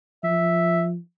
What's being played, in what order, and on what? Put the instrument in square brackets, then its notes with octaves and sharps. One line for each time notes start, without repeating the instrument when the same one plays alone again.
[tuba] F3 [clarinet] E5